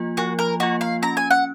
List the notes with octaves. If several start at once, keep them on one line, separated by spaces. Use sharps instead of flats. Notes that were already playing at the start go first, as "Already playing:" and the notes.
Already playing: F3 A#3 F4
F3 F#4
A#4
A#3 F4 F#4
F5
C#4 A#5
G#5
F#5